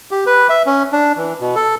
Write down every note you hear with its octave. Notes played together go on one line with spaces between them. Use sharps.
G4
B4
E5
C#4
D4
E3
B2
A4